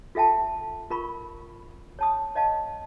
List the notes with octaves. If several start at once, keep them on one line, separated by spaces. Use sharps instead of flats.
F4 A4 E5 G5 A5
F4 A#4 B5 C#6
C#5 A5 D#6
C#5 D#5 F5 A5